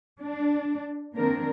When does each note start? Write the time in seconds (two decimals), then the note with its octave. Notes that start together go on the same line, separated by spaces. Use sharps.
0.21 D4
1.17 D#3 A#3 C4 D4 A#4